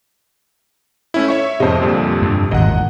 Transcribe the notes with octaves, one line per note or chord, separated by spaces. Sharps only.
A3 C#4 E4
C#5 E5 C#6
F2 C3 C5 D#5
A#2 D3 G3
G2
G#1 E2 A#2 D#5 F#5